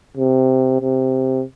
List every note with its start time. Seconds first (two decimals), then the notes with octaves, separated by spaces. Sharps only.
0.17 C3
0.81 C3